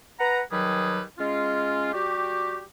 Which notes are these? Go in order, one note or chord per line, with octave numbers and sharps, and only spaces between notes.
B4 F#5 A#5
D#3 F#3 G3 G#4 B4
G#3 C#4 F4
G3 F#4 G4